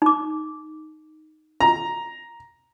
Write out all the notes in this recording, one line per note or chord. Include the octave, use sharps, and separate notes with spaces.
D#4 D6
A#5